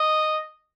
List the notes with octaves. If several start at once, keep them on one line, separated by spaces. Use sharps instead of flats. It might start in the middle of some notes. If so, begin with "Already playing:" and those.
Already playing: D#5